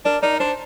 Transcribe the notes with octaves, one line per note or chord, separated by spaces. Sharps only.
D4 A#4 D5
D#4 A#4 D5
D4 C5